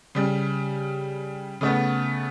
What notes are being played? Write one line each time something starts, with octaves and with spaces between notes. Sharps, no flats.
C#3 G3
C#3 A3 B3